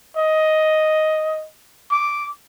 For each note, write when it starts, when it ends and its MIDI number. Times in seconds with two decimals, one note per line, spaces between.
0.17 1.45 75
1.91 2.27 86